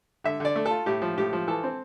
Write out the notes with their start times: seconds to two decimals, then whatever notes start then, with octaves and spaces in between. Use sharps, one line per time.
0.24 D3 E5
0.40 D3 D5
0.56 A3
0.66 F4 A4
0.86 A2 G4
1.02 F3
1.17 A2 G4
1.33 F3
1.48 E3 A4
1.64 C4